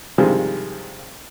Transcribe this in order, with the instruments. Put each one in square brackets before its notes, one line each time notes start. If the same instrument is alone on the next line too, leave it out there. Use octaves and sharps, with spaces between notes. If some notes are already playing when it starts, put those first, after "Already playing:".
[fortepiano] G2 C3 D#3 F3 G3 G#3